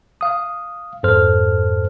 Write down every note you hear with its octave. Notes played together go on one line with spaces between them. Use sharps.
F5 D#6
F2 G#2 A4 C5 F6